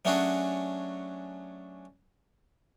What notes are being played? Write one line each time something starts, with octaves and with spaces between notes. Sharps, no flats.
F#3 A3 C#4 D4 F#4 G#4